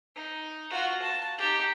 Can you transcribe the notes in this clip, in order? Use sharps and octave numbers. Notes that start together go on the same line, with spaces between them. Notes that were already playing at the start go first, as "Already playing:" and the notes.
D#4
F4 F#4
A5
D#4 G4